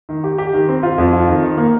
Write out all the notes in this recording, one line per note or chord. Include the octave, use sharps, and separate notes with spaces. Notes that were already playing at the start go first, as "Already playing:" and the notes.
D#3
G4
G4
D#3
C4
F4
F2
F4
D#3
D#3
A#3